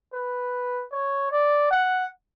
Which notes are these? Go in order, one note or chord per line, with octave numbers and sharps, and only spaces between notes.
B4
C#5
D5
F#5